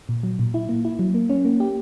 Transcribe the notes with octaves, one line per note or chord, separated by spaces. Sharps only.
A#2
F#3
A#2
E4
A#3
E4
F#3
A#3
C#4
A#3
G4